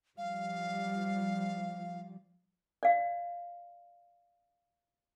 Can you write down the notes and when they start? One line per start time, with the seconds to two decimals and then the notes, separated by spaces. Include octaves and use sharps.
0.18 F3 G3 F5
2.83 D5 F5